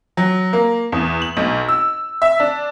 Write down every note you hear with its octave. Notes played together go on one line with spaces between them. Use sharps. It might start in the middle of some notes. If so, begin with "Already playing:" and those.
F#3
A#3
E2
F#7
B1
E6
E5
D4